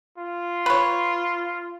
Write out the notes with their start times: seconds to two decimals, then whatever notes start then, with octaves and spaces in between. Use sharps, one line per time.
0.18 F4
0.66 B4 C#5